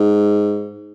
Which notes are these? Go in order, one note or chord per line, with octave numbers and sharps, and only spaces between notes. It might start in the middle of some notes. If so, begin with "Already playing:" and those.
Already playing: G#2